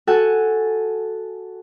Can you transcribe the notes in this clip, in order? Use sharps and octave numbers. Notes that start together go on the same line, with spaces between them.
F#4 A4 F#5 G#5 F#6